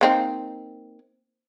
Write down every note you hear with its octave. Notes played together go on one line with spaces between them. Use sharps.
A#3 C4 D#4